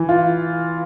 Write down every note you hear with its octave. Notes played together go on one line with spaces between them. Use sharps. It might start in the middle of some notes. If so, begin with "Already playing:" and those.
Already playing: E3
F4